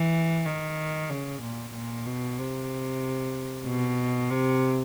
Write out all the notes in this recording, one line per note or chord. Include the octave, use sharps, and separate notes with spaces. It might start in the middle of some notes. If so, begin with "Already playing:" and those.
Already playing: E3
D#3
C#3
A#2
A#2
B2
C3
B2
C3